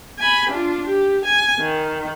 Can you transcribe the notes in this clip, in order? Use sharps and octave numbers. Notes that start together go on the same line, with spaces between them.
G#5 B5
D4 F4
G4
G#5
D#3